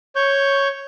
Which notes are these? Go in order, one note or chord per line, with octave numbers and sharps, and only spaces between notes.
C#5 C#6 G6